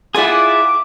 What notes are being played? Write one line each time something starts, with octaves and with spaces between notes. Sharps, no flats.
E4 F4 G#4 D5 F#5 D6